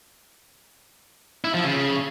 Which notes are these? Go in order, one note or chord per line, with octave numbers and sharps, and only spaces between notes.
E4
F3
C#3